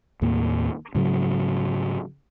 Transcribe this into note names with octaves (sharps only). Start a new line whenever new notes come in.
D#2 A2 A#3
G#2 C#3 F#3